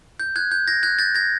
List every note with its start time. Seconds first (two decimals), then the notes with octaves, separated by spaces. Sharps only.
0.20 G6
0.36 F#6 G#6
0.51 G6
0.67 G#6 A#6
0.83 F#6 G#6
0.99 G6 A6
1.15 G#6 A#6